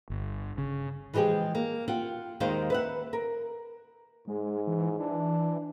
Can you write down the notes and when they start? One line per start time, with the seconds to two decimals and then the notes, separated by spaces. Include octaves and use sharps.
0.10 G1
0.58 C#3
1.14 E3 F3 G#3 G4 G#4
1.55 A#3
1.88 F4 F#5 G5
2.40 D#2 D#3 G#3 D#4 C5 F5
2.70 B4 E5 F#5
3.13 A#4
4.27 G#2 G#3
4.67 E3
5.00 E3 D4